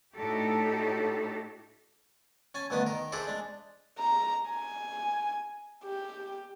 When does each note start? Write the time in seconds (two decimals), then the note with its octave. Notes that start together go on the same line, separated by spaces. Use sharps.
0.15 A2 D4 D#4 F#4 G4 A4
2.55 C#4 G#5 A5
2.70 D2 G2 D#3 B3 D4 D#6
2.86 D#3 A#4
3.12 D4 E4 G#4 A4 C5 D5
3.27 G#3 D4
3.99 A#5
4.50 G#5
5.85 G4